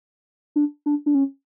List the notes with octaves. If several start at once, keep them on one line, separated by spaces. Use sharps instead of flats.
D4
D4
D4
C#4